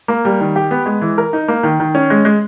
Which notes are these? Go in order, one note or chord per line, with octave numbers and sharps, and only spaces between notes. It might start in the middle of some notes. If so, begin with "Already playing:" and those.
A#3
G3
D#3
G4
B3
G#3
E3
A#4
D#4
A#3
D#3
D#3
C#4
G#3
G#3